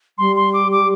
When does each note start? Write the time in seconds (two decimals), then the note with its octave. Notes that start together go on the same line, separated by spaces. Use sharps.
0.18 G3 C6
0.36 C6
0.54 D6
0.72 D6